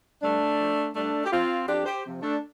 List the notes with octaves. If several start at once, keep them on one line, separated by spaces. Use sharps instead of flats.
G2 A3 D4
F3
G2 A3 D4
G4
F3 C4 F4
F2 D4 G4
G4 C5
C3 F3
A3 D4